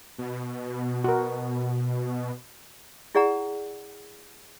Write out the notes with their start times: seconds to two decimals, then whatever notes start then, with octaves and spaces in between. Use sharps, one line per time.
0.18 B2
1.04 F#4 A#4
3.15 E4 G#4 D5 F#5 A#5